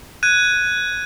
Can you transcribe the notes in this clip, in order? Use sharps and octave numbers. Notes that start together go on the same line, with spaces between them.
F#6 G#6 D#7